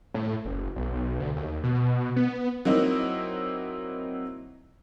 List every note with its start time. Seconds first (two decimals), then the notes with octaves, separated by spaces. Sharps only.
0.14 A2
0.45 F#1
0.76 B1
1.19 D2
1.36 D#2
1.64 B2
2.16 B3
2.65 F#3 A#3 C4 D#4 E4